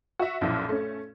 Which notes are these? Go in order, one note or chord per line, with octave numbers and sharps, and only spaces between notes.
F#4 E5
B1 F#2 A#2 F3 E4
A3 C#4